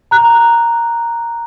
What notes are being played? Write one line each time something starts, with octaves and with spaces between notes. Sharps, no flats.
A#5 F#6